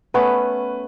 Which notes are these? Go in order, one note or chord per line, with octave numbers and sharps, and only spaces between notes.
A3 B3 C#4 B4